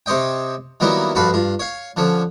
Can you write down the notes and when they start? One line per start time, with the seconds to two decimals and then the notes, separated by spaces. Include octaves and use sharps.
0.06 C3 C5 C#5 D#5 G5
0.80 D#3 F#3 G3 A#3 B3 E4
1.15 A#1 G2 F#4 A4 B4 F5
1.33 G2 F4
1.59 C#5 F5
1.97 D3 F3 C#4